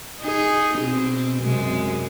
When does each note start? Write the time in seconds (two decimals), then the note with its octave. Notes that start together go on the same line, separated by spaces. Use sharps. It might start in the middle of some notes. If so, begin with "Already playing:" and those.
0.21 D#4 G#4
0.79 B2 C4
1.41 F#2 C3 G#3